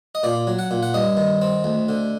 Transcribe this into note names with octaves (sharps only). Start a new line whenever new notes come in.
D#5
A#2 D5
F#3
F#5
A#2
F#5
G2 D#5
D#3
C4
D2
D3